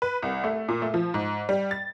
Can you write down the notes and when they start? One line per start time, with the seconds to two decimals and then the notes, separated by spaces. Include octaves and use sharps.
0.02 B4
0.22 C2
0.44 A3
0.69 A#2
0.82 A3
0.94 F3
1.14 G#2
1.49 G3
1.71 A6